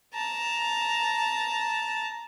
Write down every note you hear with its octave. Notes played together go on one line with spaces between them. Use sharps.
A5 A#5